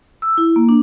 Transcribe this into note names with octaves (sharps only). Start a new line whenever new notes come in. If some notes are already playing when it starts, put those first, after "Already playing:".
E6
E4
A#3
D4